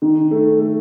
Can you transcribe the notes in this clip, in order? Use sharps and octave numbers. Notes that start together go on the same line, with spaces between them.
D#3
A3
A3